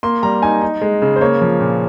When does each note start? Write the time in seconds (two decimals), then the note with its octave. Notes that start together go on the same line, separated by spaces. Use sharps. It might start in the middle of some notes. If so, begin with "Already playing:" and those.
0.03 A#3 C6
0.23 G3 A#5
0.42 D#4 G#5
0.62 D#4
0.82 G#3
1.02 C#3
1.16 C5
1.21 A#3 C#5
1.41 F3
1.60 A#2